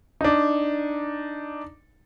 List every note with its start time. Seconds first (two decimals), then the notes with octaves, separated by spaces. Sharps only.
0.21 D4 D#4